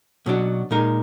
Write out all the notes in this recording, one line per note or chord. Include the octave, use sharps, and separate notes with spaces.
B2 F#3 D4 F#4
A#2 G#3 D#4 A#4